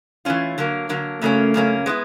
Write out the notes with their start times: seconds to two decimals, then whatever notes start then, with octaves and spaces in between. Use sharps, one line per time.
0.25 E3 A3 C#4 F4
0.58 D3 F#3 A#3
0.89 D3 F#3 A#3
1.21 F#2 C#3 F#3 A3 A#3 C#4
1.54 F#2 C#3 F#3 A#3 C#4
1.86 G#3 B3 E4